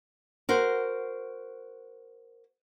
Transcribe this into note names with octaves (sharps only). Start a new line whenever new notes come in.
F#4 A#4 C5